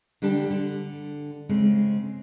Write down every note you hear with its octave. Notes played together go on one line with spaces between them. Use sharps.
D3 G3 D4 G4
D3
C#3 G#3 C4